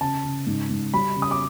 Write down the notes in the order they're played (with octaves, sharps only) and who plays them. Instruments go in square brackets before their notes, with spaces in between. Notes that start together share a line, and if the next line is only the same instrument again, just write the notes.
[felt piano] C#3 A5
C#3
G#2
G#2
G3 B5
C#3
D#6
D6